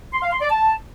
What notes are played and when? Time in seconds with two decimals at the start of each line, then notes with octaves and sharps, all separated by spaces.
0.13 C6
0.22 F5
0.32 C6
0.41 D5
0.50 A5